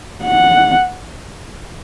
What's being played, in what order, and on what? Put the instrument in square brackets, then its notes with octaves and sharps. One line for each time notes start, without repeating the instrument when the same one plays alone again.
[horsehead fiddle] F#5